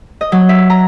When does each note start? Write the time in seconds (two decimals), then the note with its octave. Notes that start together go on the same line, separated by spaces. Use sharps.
0.21 D#5
0.32 F#3
0.49 E5
0.70 A#5